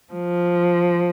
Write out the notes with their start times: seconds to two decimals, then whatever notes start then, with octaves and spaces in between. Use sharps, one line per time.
0.13 F3